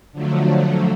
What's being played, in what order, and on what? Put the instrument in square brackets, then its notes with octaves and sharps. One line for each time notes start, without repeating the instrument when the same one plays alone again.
[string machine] D3 F3 F#3 A3